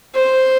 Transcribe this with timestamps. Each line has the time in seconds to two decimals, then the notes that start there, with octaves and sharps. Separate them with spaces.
0.15 C5